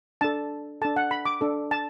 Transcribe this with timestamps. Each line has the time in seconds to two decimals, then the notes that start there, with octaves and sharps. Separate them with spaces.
0.21 D4 A4 A5
0.81 A4 A5
0.85 D4
0.96 F#5
1.11 B5
1.25 D6
1.41 D4 A4
1.71 A5